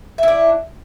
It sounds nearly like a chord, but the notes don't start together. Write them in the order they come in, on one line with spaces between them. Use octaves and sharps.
E5 E4 D4